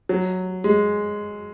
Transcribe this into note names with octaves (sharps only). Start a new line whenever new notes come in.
F#3
G#3